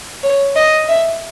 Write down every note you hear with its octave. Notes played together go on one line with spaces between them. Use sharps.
C#5
D#5
E5